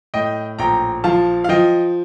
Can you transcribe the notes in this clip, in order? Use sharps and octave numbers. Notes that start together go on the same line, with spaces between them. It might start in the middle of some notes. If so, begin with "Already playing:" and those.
A2 D#5 G5
A#1 G5 A#5
F3 F5 A5
F5
F3 D#5 G5